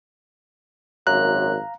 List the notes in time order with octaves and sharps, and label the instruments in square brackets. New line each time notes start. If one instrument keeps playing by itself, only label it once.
[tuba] G#1 [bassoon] F#2 [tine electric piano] F5 A#5 [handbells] F#6